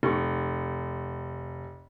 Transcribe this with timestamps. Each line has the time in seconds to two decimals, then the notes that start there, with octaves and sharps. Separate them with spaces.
0.03 F1 C#6